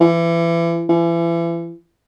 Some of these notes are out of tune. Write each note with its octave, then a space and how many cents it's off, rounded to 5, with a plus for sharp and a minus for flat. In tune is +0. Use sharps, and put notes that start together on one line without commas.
E3 +30
E3 +35